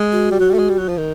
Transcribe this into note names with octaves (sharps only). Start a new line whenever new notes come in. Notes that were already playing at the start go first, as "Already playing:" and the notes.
Already playing: G#3
F#4
G3
F#3
G3
A3
G#3
G3
F#3
F3
D#3